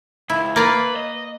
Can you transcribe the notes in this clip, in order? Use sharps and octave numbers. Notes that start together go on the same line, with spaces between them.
C#2 E4
A#3 B4 D5 F5
D#5